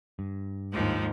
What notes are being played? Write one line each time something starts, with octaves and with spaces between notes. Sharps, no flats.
G2
D#2 G#2 F3